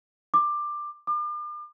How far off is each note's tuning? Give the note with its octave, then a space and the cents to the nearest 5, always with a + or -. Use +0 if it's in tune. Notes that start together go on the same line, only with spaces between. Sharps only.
D6 +15
D6 +40